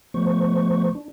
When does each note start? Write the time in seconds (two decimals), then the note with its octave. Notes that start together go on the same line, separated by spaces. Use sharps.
0.14 F3 A3 B3 C5 C#6
0.95 D4